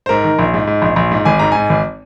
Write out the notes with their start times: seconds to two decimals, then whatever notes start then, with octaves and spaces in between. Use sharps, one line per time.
0.06 C5
0.09 G#2 A#4
0.24 D#3
0.39 A#1
0.54 G#2
0.67 G#2
0.82 A#1
0.96 A#1
1.12 G#2
1.25 G#1 G#5
1.39 G#2 A#5
1.52 G#2 G#5
1.70 G#1